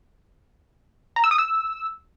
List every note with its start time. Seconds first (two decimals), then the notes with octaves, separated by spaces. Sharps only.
1.16 A#5
1.24 E6
1.31 D#6
1.38 E6